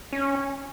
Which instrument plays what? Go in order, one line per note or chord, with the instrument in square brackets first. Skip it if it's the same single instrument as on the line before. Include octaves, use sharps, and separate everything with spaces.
[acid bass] C#4